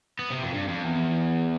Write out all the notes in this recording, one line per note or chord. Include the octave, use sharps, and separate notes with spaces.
B3
C3
F2
G2
F2
E2